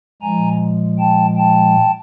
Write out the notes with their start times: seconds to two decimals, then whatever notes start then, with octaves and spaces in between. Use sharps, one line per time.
0.22 A#2 F3 G#3 G#5 A#5
0.99 G5 A5
1.37 G5 A5